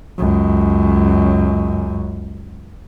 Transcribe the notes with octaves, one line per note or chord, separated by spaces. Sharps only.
C#2 F#2